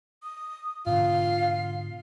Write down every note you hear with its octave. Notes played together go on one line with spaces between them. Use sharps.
D#6
G#2 B2 D3 F4 F5